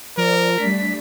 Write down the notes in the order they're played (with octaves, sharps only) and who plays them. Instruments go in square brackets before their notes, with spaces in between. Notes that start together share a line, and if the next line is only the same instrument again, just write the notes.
[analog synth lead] F3 [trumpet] A#4 [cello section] D5
[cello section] G3 A3 D4 [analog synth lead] B6